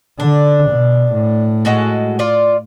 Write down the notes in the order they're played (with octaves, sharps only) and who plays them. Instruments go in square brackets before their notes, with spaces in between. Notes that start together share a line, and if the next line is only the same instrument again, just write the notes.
[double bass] D3 [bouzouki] D4
[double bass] B2
A2
[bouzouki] G#3 F#4 A4
F4 D5